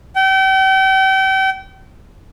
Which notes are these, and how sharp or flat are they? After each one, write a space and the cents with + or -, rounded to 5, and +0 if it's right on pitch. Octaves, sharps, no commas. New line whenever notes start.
G5 -40